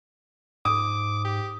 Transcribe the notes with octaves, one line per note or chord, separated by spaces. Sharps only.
G#2 D6 D#6
G4